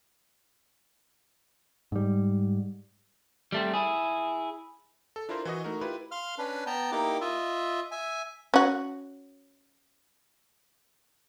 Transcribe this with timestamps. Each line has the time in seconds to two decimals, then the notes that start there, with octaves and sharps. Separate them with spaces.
1.92 G#2 G3
3.52 G3 A3 C4
3.74 E4 G#4
5.16 A4
5.29 D4 E4 F4 A#4 C5
5.45 E3 F#4 D#5
5.64 A3 D#4 F#4 A#4
5.81 E4 F4 G4 B4
6.11 F5 C6 F6
6.38 C#4 D4 B4
6.67 B3 G5 A5 A#5
6.92 A#3 D#4 E4 G4 D6
7.21 F4 D#5 E5
7.91 E5 G#5
8.54 C#4 F#4